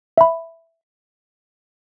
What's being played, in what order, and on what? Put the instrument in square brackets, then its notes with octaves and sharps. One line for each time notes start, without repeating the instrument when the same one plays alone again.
[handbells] E5 B5